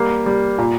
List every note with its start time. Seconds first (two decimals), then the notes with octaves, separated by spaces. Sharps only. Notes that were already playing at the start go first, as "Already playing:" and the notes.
Already playing: G3 A#3
0.26 G3
0.58 A#2